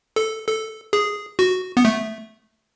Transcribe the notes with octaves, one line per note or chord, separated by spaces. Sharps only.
A4
A4
G#4
F#4
B3
A3